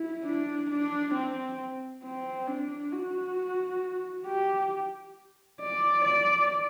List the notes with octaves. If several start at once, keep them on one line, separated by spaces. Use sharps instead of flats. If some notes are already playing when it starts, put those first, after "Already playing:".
Already playing: E4
D4
D4
C4
C4
D4
F#4
G4
D5
D5